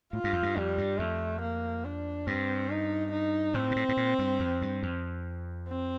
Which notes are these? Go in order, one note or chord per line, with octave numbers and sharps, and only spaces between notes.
A2 F4
G2
F2
G2
F2 G3
G2
F2 A3
A#3
D4
G2 C4
D#4
D#4
A2 C4
A#2
A2
A2
A#2
G2
F2
G2
F2
C4